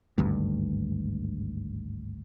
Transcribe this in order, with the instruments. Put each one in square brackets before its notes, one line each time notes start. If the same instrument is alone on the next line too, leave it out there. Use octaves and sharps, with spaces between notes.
[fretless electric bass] G#1 D2 G2